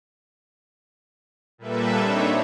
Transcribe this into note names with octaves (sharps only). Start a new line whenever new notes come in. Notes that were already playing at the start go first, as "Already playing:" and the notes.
A#2 G3 A#3 A4 B4 E5
C4 D4 D#4 C#5 E5